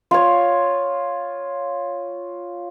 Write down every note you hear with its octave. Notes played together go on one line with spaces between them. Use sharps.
F4 C#5